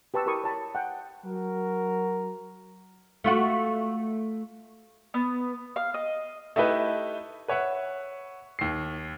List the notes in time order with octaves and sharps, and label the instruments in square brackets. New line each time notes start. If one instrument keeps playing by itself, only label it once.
[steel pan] G4 B4 A5 C#6 E6
E4 G4 A#4 B5 C#6 D#6
C#5 A5 B5
F#5 G5
[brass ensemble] F#3 F#4 A#4
[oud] A3 F4 F#4
[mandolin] B3
F5
D#5
[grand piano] A3 D#4 E4 G4 B4
B4 C#5 E5 F#5
D#2 C7